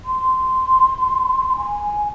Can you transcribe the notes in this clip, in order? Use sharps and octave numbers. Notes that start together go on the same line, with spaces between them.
C6
G#5